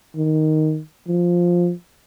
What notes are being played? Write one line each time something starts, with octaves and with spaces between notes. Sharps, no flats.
D#3
F3